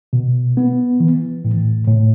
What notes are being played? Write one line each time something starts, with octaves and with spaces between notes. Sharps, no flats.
B2
B3
E3
A2
A2